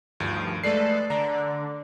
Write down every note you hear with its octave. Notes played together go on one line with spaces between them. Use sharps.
D2 G2 D#3 F3
G#3 A3 A4 B4 D5 C7
D3 D4 A#5